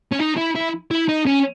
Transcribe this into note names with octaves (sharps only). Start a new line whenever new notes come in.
C#4
D#4
E4
E4
E4
D#4
C#4